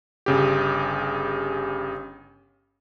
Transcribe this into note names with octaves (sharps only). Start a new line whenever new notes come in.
G1 C#3 G4